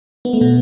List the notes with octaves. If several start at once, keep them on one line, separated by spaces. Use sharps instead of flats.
B3
A3
B2 B3